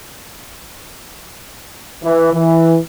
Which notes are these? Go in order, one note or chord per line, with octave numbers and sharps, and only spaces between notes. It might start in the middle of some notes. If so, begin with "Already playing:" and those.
E3
E3